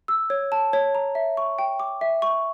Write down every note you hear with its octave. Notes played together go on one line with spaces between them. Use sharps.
E6
C#5
A5
C#5
A#5
E5
C#6
G5
D6
E5
C#6